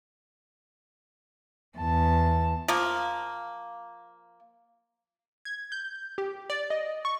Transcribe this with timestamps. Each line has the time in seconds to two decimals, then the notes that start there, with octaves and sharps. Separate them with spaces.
1.77 E2 A5
2.68 F3 A#3
5.45 G#6
5.72 G6
6.18 G4
6.50 D5
6.70 D#5
7.05 C#6